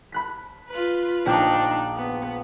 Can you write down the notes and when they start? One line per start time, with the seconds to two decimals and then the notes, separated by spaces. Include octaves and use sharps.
0.12 B5 F#6 B6
0.69 F4 B4
1.26 A#1 D4 D#4 G5 D6
1.96 B3